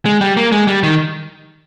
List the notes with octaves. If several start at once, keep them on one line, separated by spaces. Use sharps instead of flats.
G#3
G3
A#3
G#3
G3
D#3